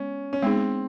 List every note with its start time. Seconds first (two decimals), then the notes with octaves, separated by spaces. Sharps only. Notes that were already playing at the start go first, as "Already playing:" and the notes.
Already playing: G#3 B3 C#4
0.33 C#4
0.42 G#3 B3 C4 D#4 G#4